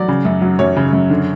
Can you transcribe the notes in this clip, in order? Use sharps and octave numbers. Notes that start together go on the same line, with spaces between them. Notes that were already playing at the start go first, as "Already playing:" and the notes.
Already playing: F#3 D5
C#3
F#2
F#3
F#2 C#5
C#3
F#2
D3